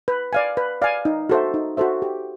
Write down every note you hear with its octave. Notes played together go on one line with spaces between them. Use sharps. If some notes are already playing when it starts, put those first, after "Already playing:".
B4
D5 F5 G#5
B4
D5 F5 G#5
D#4
F#4 A4 C5 E5
D#4
F#4 A4 C5 E5
G4